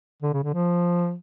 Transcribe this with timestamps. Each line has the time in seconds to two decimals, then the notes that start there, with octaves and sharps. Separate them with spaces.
0.22 D3
0.33 C#3
0.43 D3
0.54 F3